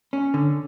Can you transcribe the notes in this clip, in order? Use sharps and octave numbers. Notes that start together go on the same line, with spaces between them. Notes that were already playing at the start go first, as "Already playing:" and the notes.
C#4
D3